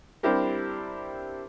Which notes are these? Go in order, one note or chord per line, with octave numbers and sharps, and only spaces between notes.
G3 C4 D4 E4 G4 A#4